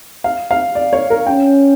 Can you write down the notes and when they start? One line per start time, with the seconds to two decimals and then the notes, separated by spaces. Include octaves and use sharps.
0.24 F5
0.51 F5
0.75 D5
0.93 C#5
1.10 A#4
1.27 C#4 G5